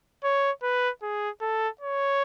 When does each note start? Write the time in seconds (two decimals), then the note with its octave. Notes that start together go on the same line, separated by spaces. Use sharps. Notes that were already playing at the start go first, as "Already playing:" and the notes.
0.24 C#5
0.63 B4
1.02 G#4
1.41 A4
1.81 C#5